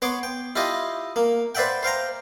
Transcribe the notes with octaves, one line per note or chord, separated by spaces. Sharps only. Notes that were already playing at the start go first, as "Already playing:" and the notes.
B3 C#5 C6 D6
G5
E4 F4 G4 D#5
A#3
B4 C5 D5 E5 F#5 G5
C5 F5 G5 A#5